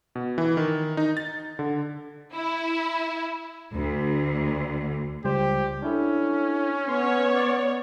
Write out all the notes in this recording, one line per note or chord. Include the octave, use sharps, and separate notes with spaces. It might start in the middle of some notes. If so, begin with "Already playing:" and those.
B2
E3
D#3
D#4
A6
D3
E4
D2
C#2 G3 G4 C5
C#4 D4 E4 A4
B3 C#5 C6
D5